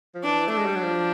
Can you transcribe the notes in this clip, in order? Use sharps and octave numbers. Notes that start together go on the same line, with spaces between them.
F3
E3 D4
A3
G#3 D4
G3
F#3
F3